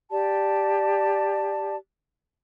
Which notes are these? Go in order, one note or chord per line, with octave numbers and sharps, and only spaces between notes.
G4 D5 A5